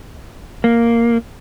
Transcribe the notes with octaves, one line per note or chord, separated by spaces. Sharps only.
A#3